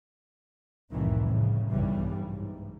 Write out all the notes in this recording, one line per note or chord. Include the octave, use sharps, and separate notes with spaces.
C2 F2 A2 D#3 E3
A2 C#3
B1 G2 C#3 E3 G3
G#2